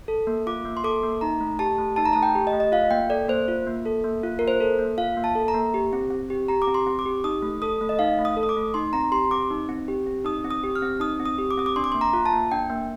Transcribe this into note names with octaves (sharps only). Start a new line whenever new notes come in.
A4
A#3
F4 D6
A#3
C6
A4 D6
A#3
D#4 A#5
A3
G4 A5
A3
D#4 A5
A#5
A3 A5
G5
G4
D#5
A3
D#5
F4 F5
A#3 G5
A4 D5
A#3 C5
F4
A#3
A4
A#3
F4
A#3 A#4
C5
A4
A#3
F4 F5
A#3
A5
A4
A#5
A#3
G4
C4
C4
G4
G4 A#5
D6
C4
C6
C4
D6
G4
D#4 D#6
A3
A4 D#6
A3
D#5
D#4 F5
A3
D#6
A4
D#6
D6
A3
D#4 C6
C4 A#5
G4 C6
C4 D6
D#4
C4
G4
C4
D#4 D#6
C4
D#6
G4
F6
C4
D#4 D#6
C4
D#6
G4
D6
C4 D#6
D6
D4 C6
D6
A#3 C6
A#5
F4
A5
A#3
D4 G5
A#3